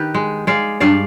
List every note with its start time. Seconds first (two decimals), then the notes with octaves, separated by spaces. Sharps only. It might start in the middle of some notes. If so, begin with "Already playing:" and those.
Already playing: D#3 G4 B4
0.15 G#3
0.47 G#3 D5 F5
0.80 G2 D5 F5